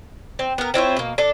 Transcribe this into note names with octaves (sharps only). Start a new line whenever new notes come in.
C4
B3 A#4
C4 E4 F4 C#5
B2 A#3
D4 A4